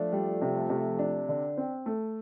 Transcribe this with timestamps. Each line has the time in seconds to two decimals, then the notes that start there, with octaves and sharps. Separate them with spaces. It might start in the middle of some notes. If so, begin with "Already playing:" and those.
Already playing: F3 A3 D4
0.13 G3
0.42 C3
0.69 C3
0.99 D4
1.29 D3
1.57 C4
1.86 A3